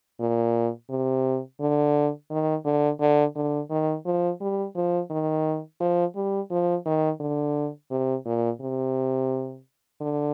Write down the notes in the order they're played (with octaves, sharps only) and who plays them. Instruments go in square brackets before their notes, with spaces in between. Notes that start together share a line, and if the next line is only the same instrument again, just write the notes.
[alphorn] A#2
C3
D3
D#3
D3
D3
D3
D#3
F3
G3
F3
D#3
F3
G3
F3
D#3
D3
C3
A#2
C3
D3